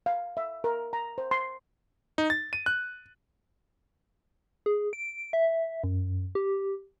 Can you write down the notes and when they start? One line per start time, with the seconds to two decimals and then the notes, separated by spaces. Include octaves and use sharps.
0.06 F5
0.37 E5
0.64 A#4
0.93 A#5
1.18 C5
1.31 C6
2.18 D#4
2.30 A6
2.53 D#7
2.66 F#6
4.66 G#4
4.93 D7
5.33 E5
5.84 F#2
6.35 G4